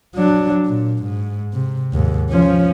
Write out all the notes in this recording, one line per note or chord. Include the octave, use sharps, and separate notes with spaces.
F#3 D4
A#2
G#2
C3
D#2 G#2
F3 C#4